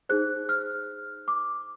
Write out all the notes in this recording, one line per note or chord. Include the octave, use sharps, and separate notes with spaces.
D#4 G#4 C5 F#6
F6
D6